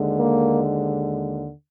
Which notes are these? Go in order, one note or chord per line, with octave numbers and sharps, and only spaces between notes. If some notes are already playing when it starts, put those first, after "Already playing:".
Already playing: D#2 D3 G#3
A#3